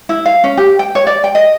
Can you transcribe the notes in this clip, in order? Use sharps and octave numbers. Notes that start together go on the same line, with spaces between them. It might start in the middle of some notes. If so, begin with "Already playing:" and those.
E4
F5
C#4
G4
G5
C#5
D5
G5
D#5